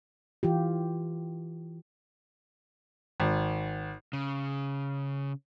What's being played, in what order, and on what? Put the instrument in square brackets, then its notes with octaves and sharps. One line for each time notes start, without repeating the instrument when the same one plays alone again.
[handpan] E3 F4 G4
[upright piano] G#1
[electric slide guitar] C#3